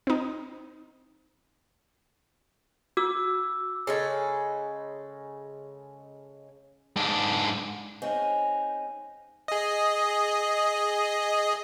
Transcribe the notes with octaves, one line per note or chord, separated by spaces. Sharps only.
C4 D#4
F#4 D6 E6
C#3 G#3 A4
G#2 D4
G#3 A#3 C4 C#4 D#4 G#4
G#4 D#5